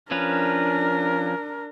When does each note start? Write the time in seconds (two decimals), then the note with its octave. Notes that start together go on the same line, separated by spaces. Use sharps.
0.11 F3 C#4 D4 A#4 B4